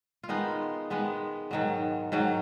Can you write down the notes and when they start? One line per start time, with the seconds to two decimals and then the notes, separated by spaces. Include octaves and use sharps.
0.23 F4
0.29 D#3 G#3 B3 D#4
0.90 D#3 G#3 B3
1.51 G#2 D#3 F#3
2.12 G#2 D#3 F#3